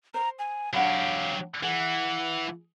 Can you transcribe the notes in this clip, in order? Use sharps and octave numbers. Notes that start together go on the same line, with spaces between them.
C5 A#5
G#5
F#3 D4 G4 F5 F#5 B5
E3 G#4 F#5